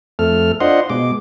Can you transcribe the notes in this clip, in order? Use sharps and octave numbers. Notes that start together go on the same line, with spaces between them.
F2 A3 A4 F6
D4 F4 C5 D#5 F#5 C6
B2 G#3 D6